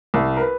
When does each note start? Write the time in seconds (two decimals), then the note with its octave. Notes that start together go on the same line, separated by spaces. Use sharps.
0.14 C2
0.37 A#4
0.41 B4